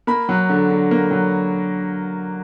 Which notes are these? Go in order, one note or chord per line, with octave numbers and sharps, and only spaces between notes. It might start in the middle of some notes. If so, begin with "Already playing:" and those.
A#3 B5
F#3
D3
D3
A#3
F#3